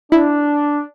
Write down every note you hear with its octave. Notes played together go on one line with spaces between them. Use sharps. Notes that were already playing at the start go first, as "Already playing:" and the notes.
D4 E4